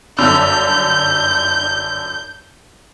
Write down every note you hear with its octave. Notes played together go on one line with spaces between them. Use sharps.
G1 F#2 D3 G6